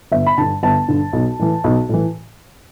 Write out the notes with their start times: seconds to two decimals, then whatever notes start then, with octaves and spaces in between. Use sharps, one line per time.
0.12 G1 E5
0.26 B5
0.38 G2 D3 A5
0.63 G1 A5
0.88 G2 D3
1.13 B1
1.39 A2 E3
1.64 B1
1.89 A2 E3